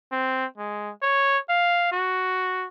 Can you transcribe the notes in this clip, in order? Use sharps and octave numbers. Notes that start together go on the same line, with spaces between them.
C4
G#3
C#5
F5
F#4